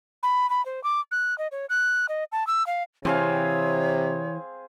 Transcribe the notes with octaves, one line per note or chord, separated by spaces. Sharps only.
B5
B5
C5
D6
F#6
D#5
C#5
F#6
D#5
A5
E6
F5
C3 E3 C4 G#4 C#5 F5